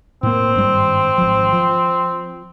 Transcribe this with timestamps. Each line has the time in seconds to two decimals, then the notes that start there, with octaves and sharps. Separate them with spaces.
0.23 A2 A#3 C4
0.55 G#1 G2 G3
1.18 G#1 F3
1.53 F3